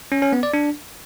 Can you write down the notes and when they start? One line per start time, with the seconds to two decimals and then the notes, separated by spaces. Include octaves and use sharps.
0.12 C#4
0.22 C#4
0.33 B3
0.43 D5
0.54 D4